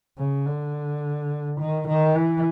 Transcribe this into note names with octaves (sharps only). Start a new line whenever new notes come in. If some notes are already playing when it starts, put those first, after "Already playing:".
C#3
D3
D#3
D#3
E3